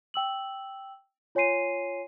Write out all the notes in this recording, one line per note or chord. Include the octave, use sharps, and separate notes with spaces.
G5 E6 F#7
F4 C#5 G#5 C6 C7 D#7